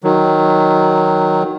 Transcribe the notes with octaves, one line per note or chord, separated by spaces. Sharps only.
D#3 F#3